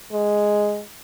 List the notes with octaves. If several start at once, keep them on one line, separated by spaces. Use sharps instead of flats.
G#3